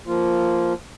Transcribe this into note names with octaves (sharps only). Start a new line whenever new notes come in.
F3 A#3 F4